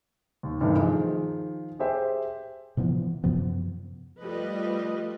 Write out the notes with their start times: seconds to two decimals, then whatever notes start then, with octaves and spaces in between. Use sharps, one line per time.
0.43 D#2
0.61 G2 C3 D#3 E3 A3
0.77 D#3 F3 G#4
1.79 G4 G#4 C5 E5 G5
2.77 C3 E3 F3 B3
3.24 F#2 C3 F3 B3
4.19 F3 G3 A3 B4 D#5